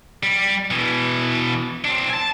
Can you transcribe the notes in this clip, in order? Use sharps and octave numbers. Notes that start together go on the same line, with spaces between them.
G3
B2 E3
C4 D4
G#5 A5